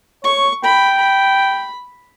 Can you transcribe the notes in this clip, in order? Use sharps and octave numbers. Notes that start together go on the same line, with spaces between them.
C#5 C#6
G5 B5
B5